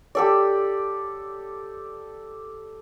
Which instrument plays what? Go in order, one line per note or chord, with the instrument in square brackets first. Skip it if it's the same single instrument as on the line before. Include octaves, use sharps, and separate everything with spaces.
[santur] G4 A4 D5